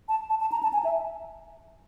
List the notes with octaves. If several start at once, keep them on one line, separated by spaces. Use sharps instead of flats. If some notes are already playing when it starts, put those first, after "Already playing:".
A5
A5
A5
A#5
A5
G#5
E5